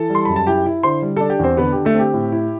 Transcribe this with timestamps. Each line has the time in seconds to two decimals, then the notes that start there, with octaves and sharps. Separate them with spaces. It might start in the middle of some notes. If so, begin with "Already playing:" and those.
Already playing: E3 A4 A5
0.10 G3
0.15 C6
0.25 F#2 B5
0.36 A5
0.47 E4 G4 G5
0.66 E4
0.83 D3 C5 C6
1.02 G3
1.16 D4 A4 A5
1.30 G4 G5
1.39 E2 C4 C5
1.57 D3 B3 B4
1.72 D3 G4
1.85 A3 A4
1.94 C4 G4
2.14 A2
2.32 E4